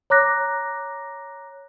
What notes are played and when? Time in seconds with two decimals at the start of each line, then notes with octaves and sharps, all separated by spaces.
0.10 C#5 A#5 D6 F#6 A#6